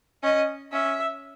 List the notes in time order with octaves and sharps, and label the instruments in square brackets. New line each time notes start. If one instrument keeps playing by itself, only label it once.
[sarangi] C#4 [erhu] D#5
[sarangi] C#4 [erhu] E5